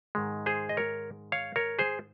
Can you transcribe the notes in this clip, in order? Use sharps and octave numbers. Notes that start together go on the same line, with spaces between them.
G#2 D#3 G#3
G#4 C5
D#5
A#4 C#5
C#5 F5
A#4 C#5
G#4 C5